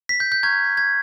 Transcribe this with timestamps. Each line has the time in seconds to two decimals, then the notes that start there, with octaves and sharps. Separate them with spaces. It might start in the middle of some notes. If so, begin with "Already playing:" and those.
0.09 B6
0.20 G6
0.32 G6
0.43 A#5 C#6 F6 G#6
0.77 G#6